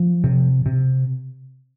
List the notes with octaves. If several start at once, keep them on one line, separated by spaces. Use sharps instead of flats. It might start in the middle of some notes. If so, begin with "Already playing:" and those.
Already playing: F3
C3
C3